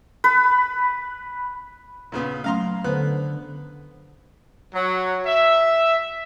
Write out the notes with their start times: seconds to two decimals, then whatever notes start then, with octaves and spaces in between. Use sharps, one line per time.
0.24 B4
2.12 A#2 C#3 B3
2.44 F#3 A3 C#4 F5 A#5 C6
2.84 D3 B3 B4 C5 F#6
4.75 F#3
5.26 E5